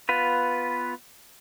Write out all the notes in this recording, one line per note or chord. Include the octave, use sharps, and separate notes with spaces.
B3 F4 B4